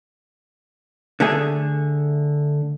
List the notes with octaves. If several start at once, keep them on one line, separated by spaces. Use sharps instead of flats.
D3 A3 G#4